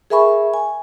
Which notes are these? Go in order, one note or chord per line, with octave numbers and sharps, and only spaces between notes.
G#4 A#4 E5 G#5 B5 C#6
G#5